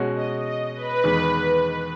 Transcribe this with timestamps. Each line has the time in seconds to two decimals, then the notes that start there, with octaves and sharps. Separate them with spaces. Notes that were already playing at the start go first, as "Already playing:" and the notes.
Already playing: B2 G#3 C#4 F#4
0.16 D#5
0.45 D#5
0.75 B4
1.04 E2 D#3 G#3